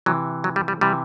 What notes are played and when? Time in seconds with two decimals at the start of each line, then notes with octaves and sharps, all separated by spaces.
0.06 C3 E3 F#3
0.44 F#3
0.56 G3
0.68 G3
0.81 C3 E3 G3